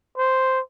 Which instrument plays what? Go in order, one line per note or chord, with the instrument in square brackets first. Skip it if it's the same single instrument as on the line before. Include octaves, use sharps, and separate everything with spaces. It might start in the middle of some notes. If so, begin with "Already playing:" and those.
[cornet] C5